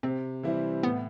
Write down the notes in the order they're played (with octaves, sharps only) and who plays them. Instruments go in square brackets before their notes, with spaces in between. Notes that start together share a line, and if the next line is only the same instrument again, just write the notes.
[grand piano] C3 [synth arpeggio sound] C4
[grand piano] E3 G3 C4 E4
[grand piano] A2 [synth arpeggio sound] B3